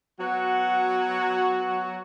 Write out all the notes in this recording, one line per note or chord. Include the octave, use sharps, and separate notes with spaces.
F#3 B3 F#4